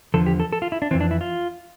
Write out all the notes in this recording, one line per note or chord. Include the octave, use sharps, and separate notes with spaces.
E2 D3 F3 A4
G4
A4
A4
F4
E4
D4
F2 E3 C4
D4
E4
F4